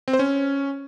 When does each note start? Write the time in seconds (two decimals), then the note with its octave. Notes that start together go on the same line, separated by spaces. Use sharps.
0.08 C4
0.13 C5
0.19 C#4